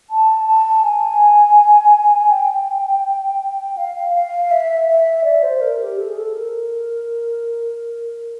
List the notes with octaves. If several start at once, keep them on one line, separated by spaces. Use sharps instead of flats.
A5
A5
G#5
G5
F5
F5
E5
E5
D5
C5
A#4
G4
A4
G#4
A4
A#4